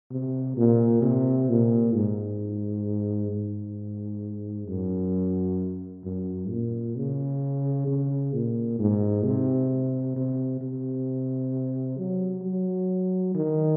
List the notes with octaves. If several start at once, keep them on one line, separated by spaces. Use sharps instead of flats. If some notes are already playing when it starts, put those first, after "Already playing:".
C3
A#2
C3
A#2
G#2
G#2
F#2
F#2
A#2
C#3
C#3
A#2
G#2
C3
C3
C3
F#3
F#3
D#3